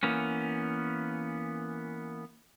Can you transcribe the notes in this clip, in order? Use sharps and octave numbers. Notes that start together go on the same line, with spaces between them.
E3 A#3 B3 C#4